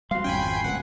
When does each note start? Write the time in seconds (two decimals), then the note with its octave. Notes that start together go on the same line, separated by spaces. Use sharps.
0.11 G3 F#4 F5 C6
0.24 G#1 F2 C#4 G5 G#5 B5
0.64 D1 C#2 F#3 F#5